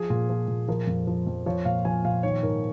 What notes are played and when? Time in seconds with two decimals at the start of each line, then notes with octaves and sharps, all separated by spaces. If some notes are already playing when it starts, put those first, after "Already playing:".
Already playing: F3 G#4
0.10 A#2
0.30 F3
0.48 A#2
0.68 F3 A#4
0.87 F2
1.07 F3
1.27 F2
1.46 F3 C#5
1.65 A#2 F5
1.85 F3 G#5
2.05 A#2 F5
2.23 D#3 C#5
2.43 G#2 A#4